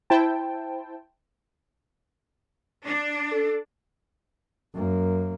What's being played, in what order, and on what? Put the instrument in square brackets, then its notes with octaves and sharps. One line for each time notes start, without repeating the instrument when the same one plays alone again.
[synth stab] E4 C5 G5 A5
[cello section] D4
[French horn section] A4
[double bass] F#2 A#3